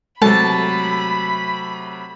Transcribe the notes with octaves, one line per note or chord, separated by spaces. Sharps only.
C3 F#3 G#3 A3 A4 A5 B5